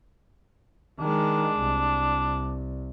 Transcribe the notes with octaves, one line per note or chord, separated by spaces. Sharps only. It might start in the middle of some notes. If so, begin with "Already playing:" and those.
D#3 G#3 D4
C2